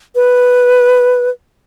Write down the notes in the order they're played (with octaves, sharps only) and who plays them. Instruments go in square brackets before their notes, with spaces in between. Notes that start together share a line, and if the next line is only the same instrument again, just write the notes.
[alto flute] B4